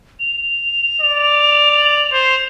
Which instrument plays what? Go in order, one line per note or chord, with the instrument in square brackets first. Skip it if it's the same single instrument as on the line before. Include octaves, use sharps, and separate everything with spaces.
[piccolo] F7
[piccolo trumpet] D5
C5